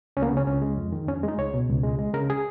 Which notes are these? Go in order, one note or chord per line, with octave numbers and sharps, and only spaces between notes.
C#2 C#4
A#3
B3
C#3 C#4
C#2 C#4
G#3
F2
D#3
F2 C#4
G#3
D#4
C#2 C#5
B2
C#2
G#3
G#3
C#3 A#4
G#4